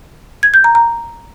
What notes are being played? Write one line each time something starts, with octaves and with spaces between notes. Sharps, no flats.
G#6
G6
A#5
A#5